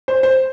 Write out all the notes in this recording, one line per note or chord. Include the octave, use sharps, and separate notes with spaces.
C5
C5